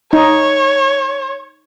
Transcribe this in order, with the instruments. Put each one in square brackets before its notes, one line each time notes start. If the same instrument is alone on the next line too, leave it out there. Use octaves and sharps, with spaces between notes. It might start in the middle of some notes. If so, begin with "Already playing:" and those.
[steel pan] D#4 [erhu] C#5